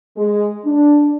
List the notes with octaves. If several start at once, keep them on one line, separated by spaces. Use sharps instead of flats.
G#3
D4